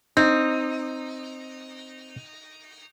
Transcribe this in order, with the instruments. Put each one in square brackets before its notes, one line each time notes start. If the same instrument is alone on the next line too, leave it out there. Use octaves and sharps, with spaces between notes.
[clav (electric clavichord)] C4 [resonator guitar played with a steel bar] D#4